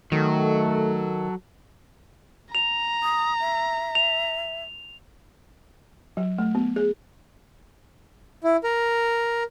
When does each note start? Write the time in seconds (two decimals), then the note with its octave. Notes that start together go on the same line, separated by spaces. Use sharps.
0.12 D#3 F#3 A3 A4
2.55 A#5 F7
3.03 D#6
3.41 E5
3.95 F7
6.17 F#3
6.38 A3
6.55 B3
6.76 G#4
8.44 E4
8.64 A#4